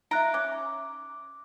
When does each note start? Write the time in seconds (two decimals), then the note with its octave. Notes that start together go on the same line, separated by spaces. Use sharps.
0.11 D#4 F4 E5 A#5 F#6 D7
0.34 C#4 D6